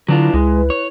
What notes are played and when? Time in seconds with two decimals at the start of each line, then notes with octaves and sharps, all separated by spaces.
0.08 D3 F#3 D4 E4 F4 B4
0.34 C#2 G#3
0.70 C#5